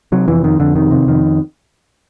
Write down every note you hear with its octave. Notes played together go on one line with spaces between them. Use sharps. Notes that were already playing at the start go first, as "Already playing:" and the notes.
C3 F#3
F2 E3
F2 D#3
F2 D3
C3 D#3
C3
F2 D#3